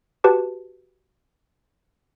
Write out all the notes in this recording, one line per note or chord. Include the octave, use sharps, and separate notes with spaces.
F#4 G4 B4 A5 D6